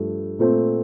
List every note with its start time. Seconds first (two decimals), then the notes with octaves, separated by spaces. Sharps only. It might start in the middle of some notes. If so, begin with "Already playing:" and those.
Already playing: G2 F3 A3
0.39 A#2 A3 C4